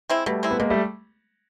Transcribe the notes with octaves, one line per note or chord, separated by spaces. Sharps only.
G#3 C4 E4
B2 G3 A3
G#3 C4 E4
B3
B2 G#3 A#3
G3 A3